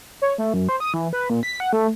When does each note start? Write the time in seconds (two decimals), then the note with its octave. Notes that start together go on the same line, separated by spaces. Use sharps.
0.22 C#5
0.38 A3
0.54 F#2
0.69 C5
0.80 D#6
0.94 E3
1.13 B4
1.30 A#2
1.43 B6
1.60 F#5
1.73 A3